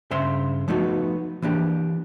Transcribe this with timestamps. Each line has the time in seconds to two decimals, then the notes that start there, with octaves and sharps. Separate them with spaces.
0.11 G2 C#3 C5 E5 C6
0.68 F3 A3 B3 D#4 F#4
1.42 E3 A#3 D4 G4